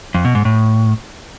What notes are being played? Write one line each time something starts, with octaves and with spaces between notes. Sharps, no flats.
F2
B2
G#2
A2